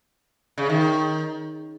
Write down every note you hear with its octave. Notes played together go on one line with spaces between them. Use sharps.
C#3
D#3